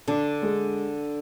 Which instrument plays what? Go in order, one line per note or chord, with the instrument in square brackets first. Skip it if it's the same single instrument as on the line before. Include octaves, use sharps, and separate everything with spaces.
[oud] D3 [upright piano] D4
[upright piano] G#3